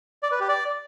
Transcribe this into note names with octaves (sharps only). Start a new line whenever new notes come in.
D5
B4
G4
D5